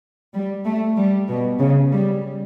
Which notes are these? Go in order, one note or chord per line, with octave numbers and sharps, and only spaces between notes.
G3
A3
G3
B2
C#3
G3